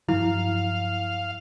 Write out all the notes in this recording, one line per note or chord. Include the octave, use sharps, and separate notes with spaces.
G2 F3 F#3 E4 F5